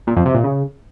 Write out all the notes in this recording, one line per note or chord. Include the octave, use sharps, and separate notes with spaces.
A#2
F2
C3
A#2
C#3